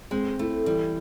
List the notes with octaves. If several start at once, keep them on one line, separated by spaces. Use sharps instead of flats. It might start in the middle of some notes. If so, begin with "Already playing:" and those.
G#3 C4
A3 E4
E3 G3